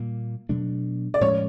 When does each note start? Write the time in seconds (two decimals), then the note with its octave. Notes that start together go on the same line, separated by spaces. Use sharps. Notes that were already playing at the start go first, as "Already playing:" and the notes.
Already playing: A#2 G3 A#3
0.49 B2 F#3 A3 D4
1.14 D5
1.21 A2 F3 G#3 C#4 C#5